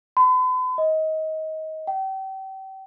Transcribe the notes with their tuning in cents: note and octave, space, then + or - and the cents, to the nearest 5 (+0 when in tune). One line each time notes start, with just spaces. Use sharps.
B5 +45
D#5 +25
G5 -35